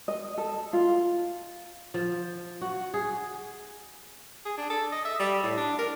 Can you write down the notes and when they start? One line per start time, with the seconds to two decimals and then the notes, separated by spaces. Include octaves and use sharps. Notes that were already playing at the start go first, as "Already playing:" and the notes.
0.08 D#5
0.38 A4
0.73 F4
1.94 F3
2.61 F#4
2.94 G#4
4.45 G#4
4.57 D4
4.70 A4
4.92 D#5
5.05 E5
5.19 G3
5.43 A2
5.57 D4
5.78 A#4